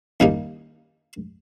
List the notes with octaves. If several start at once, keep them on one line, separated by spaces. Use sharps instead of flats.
D#2 C#3 G3 A#3 D#4